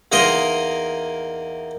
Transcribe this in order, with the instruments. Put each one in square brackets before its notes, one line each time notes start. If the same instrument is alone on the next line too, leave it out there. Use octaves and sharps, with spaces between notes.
[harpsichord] E2 A#3 D#4 A#4 D#5 C6